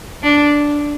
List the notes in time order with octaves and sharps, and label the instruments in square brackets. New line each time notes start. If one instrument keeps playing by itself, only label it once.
[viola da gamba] D4